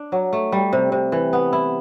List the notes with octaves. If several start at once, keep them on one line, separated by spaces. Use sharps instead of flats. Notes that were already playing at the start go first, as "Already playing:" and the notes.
Already playing: D4
F#3
A3
G3
C3
C3
E3
B3
E4